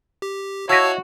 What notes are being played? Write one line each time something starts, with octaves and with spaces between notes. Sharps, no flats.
G4
E4 F#4 C#5 D#5 F5 A5 E6